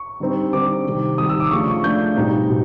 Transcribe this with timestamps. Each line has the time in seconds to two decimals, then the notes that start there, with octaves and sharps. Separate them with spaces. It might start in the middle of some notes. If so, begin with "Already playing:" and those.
Already playing: C#6
0.20 D3 G3 C4 D#4
0.53 D3 G3 C4 D#4 D6
0.85 C3 D#3 G3
1.18 C3 D#3 G3 D#6
1.29 E6
1.40 D6
1.51 C#3 F3 A3 D4 C#6
1.68 C#6
1.84 C#3 F3 A3 D4 G6
2.16 B2 G3 C4 D#4
2.49 B2